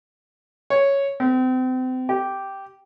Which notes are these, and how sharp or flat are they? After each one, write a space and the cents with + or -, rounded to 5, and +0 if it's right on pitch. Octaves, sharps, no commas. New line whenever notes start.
C#5 +0
C4 -35
G4 -5